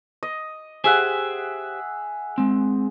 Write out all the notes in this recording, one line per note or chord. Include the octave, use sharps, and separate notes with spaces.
D#5
G4 G#4 C5 E5 F#5 G#5
G#3 C4